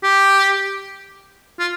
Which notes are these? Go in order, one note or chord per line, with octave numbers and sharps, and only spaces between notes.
G4
F4